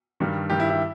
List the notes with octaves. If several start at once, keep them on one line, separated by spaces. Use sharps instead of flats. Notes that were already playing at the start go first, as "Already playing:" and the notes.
G2 D#3 G3
G2 D#3 G3 G4
E4
E4